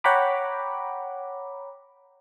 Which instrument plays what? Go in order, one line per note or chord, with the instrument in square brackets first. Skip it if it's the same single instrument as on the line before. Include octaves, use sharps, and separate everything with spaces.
[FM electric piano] C#5 F#5 G5 A#5 B5 D6